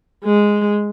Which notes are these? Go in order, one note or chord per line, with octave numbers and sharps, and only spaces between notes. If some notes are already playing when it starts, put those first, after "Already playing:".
G#3